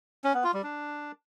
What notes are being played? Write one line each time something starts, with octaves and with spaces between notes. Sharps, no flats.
C#4
B3
F4
G3
D4